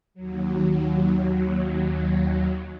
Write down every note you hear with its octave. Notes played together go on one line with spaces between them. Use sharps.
D#2 F#3